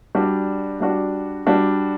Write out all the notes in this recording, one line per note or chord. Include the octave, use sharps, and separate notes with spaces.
G3 D4 F#4
G3 D4 F#4
G3 D4 F#4